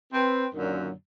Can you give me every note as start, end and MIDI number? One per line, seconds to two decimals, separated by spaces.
0.13 0.46 60
0.13 0.46 71
0.54 0.90 42
0.54 0.90 46
0.54 0.90 50
0.54 0.90 51
0.54 0.90 54